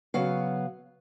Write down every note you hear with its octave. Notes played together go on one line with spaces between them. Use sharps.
C#3 F#3 B3 F5